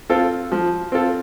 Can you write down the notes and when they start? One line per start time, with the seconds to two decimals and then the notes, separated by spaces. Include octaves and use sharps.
0.09 C4 F4 A4
0.52 F3
0.92 C4 F4 A4